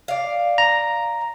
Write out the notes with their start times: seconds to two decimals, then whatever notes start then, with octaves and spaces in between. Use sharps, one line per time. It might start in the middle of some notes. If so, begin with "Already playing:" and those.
0.08 D5 F5
0.58 A#5